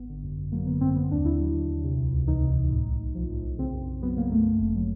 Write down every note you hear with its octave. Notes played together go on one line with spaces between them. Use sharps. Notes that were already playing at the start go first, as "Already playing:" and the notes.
Already playing: G#1 B3
D3
F#2
F#2
F#3 A#3
D3 B3
F#2 C4
D3 B3
D#2 D4
D#2 E4
F#3
D3
D#2
C3
C#2
C#2
E3 D#4
C3
C#2
A2
B1
B1
F3
A2
B1
C#3 C4
F#2
F#2
F#3 B3
C#3 A#3
F#2 A3
F#2
G1
F#3